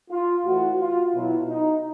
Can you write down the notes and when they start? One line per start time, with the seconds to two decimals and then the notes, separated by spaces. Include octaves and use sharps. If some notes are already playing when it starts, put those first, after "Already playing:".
0.11 F4
0.45 A2 E3 F#4
0.80 F4
1.14 B2 F#3 E4
1.49 D#4